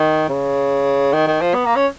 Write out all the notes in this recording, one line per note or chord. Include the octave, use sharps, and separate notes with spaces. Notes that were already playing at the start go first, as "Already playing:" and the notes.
Already playing: D#3
C#3
D#3
D#3
F3
B3
A#3
C#4